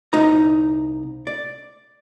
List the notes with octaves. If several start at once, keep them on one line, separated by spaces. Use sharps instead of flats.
C2 D#4 A#5
D5